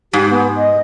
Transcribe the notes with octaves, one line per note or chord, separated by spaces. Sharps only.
G#2 G4
B3
D#5